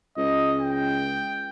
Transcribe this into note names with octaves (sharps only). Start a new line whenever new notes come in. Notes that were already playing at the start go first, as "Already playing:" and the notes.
C#2 D#5
G5